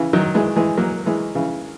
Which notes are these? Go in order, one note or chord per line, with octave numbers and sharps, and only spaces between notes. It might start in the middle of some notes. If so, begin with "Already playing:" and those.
Already playing: C#3 E3
D#3 F#3
E3 G#3
E3 G#3
F#3 A#3
E3 G#3
C#3 E3